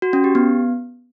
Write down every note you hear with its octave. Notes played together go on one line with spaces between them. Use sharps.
F#4
C#4
G4
B3